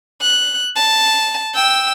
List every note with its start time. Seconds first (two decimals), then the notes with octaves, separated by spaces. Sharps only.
0.21 F#6
0.76 A5
1.55 G5 E6